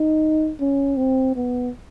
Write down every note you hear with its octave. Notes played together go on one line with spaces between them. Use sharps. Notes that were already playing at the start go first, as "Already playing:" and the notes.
Already playing: D#4
C#4
C4
B3